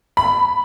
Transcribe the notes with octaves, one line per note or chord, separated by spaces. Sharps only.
B5